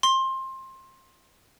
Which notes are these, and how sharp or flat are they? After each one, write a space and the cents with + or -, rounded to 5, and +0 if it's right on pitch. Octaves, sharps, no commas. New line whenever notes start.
C6 +20